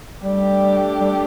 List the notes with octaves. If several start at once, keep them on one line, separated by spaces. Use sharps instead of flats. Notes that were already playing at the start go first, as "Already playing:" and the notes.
G3 A3 D4 G4
G3